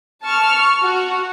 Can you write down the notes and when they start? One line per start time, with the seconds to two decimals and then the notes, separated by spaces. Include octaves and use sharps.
0.24 A5 C#6 F6
0.83 F#4